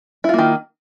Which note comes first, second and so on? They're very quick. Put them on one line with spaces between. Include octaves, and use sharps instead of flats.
E4 F4 A#3 D#3